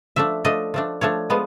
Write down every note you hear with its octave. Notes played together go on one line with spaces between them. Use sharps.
F3 A3 D4 E5
F3 A3 D4 D#5
F3 A3 D4
F3 A3 D4 C#5
F3 G#3 B3